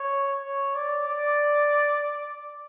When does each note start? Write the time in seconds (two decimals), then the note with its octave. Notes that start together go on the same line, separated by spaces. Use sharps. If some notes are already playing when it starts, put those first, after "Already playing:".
Already playing: C#5
0.42 C#5
0.75 D5
1.08 D5